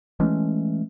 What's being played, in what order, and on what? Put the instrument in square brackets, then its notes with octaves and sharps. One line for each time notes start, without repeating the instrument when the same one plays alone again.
[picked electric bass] E3 G#3 A3 C#4